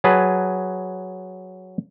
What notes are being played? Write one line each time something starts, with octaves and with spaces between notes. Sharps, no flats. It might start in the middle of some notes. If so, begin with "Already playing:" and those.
F#3 G#4 B4 A5